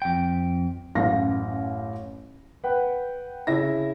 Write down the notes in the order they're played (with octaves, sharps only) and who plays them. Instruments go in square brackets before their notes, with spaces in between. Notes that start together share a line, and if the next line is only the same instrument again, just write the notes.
[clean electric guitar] F2 G5
[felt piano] A1 F#2 F5 A#6
[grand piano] B4 F#5 G5
C#3 E4 E5 A#6